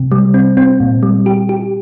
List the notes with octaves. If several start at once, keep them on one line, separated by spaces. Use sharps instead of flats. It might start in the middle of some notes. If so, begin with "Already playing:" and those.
Already playing: C3
G3
C4
C4
A#2
G3
G4
G4